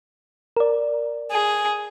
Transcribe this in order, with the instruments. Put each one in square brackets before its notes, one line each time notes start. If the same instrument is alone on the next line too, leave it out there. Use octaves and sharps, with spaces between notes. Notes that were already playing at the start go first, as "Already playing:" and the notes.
[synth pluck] A#4 D5
[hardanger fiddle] G#4